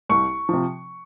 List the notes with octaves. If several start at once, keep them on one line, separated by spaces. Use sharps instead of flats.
C2 C#6
C3 F3